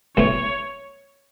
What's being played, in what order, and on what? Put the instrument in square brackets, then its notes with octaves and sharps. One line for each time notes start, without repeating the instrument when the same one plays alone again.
[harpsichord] B1 A2 E3 C#4 [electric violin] C#5